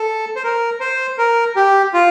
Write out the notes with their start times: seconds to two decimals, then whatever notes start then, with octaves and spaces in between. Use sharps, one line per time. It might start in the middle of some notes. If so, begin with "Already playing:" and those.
Already playing: A4
0.36 C5
0.44 A#4
0.80 C5
1.18 A#4
1.56 G4
1.94 F4